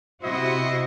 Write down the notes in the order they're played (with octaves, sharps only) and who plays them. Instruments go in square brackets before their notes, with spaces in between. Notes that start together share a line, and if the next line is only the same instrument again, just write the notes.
[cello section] C3 F#4 C5 [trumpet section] E4 D#5